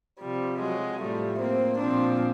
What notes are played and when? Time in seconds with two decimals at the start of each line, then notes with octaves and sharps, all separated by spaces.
0.21 C3 F3 G3
0.61 F#3 G#3
1.01 A2 F3 G3 A3
1.41 A#3 C4
1.80 A#2 F3 C4 D4